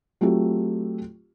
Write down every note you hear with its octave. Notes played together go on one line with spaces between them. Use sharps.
F#3 A3 C4 F4 G4